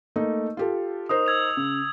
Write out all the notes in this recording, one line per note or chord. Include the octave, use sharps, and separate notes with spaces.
A3 A#3 D#4
F4 G4 A4
D#4 A#4 C5 D#6
E6 G#6 F7
C#3